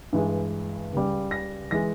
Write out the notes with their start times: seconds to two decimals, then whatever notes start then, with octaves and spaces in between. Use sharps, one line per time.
0.13 G2 E3 G#3
0.93 C#2 C#3 G3
1.31 A#6
1.71 E3 G#3 A#6